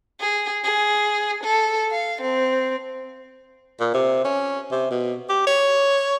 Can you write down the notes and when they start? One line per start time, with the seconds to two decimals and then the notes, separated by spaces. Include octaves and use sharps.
0.20 G#4
0.65 G#4
1.43 A4
1.91 F5
2.21 C4
3.80 A#2
3.94 C3
4.25 C#4
4.72 C3
4.91 B2
5.29 G4
5.47 C#5